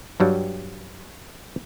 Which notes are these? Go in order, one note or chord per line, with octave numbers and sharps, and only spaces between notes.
G2 F#3 G3